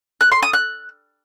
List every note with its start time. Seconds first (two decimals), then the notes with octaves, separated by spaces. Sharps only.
0.21 F#6
0.32 C6
0.43 D#6
0.53 F#6